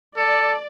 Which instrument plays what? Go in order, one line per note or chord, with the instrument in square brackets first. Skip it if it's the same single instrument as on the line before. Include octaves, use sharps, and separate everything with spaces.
[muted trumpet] A4 [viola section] D5